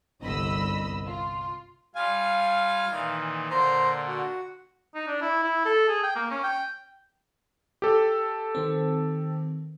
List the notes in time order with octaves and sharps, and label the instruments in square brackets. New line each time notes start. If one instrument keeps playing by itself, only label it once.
[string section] G1 C2 D#5 B5 E6
F4
[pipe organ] G3 F4 G#5 [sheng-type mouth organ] F5
[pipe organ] A#2 D#3 E3
[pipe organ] A#2 D3 [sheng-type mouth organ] C5 A#5 C6
[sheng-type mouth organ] F#4
[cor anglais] D#4
D4
E4
E4
A4
G#4
G5
A#3
C#4
G5
[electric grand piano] G4 A4
[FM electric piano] D#3 C4